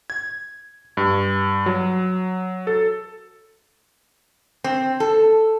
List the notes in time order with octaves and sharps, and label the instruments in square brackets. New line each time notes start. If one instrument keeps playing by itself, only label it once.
[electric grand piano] G#6
G2
F#3
A4
[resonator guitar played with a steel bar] C4
A4